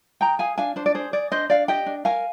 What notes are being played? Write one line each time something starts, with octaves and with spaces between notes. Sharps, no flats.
G#4 G5 A#5
G#4 F5 G#5
D4 F5 G#5
D4 C5
D5
G#4 C5
G#4 D5
D4 C5 D#5
D4 D5 F5
G4 D#5 G5
D4
A#4 F5 G#5